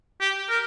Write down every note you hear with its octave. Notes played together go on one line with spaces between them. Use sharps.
G4
A#4